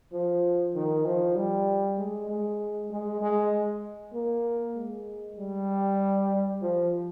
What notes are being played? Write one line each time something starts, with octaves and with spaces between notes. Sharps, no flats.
F3
D#3
F3
G3
G#3
G#3
G#3
G#3
A#3
G#3
G3
F3